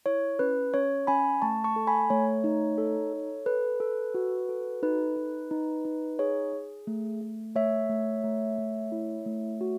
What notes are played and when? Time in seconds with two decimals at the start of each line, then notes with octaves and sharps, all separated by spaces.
0.06 E4 C#5
0.39 C#4 B4
0.74 C#4 C#5
1.07 C#4 G#5 B5
1.42 A3 A5 C#6
1.64 A5 C#6
1.76 A4
1.87 G#5 B5
2.10 A3 C#5
2.44 D#4
2.78 A4
3.13 A4
3.46 A4 B4
3.80 A4
4.14 F#4
4.49 A4
4.83 D#4 B4
5.16 D#4
5.51 D#4
5.85 D#4
6.19 G#4 C#5
6.53 G#4
6.87 A3
7.21 A3
7.55 A3 C#5 E5
7.89 A3
8.24 A3
8.58 A3
8.92 E4
9.26 A3
9.61 F#4